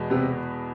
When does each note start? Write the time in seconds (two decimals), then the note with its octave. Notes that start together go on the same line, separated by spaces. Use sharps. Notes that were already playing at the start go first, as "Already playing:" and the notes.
Already playing: E2 B2 G#3
0.10 C3 B3